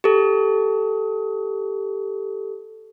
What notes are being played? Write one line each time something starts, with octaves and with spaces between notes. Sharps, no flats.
G4 A4